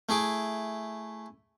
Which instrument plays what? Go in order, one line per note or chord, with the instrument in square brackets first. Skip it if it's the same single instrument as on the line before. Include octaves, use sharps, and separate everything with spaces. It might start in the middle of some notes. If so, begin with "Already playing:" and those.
[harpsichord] A3 E4 G#4 D6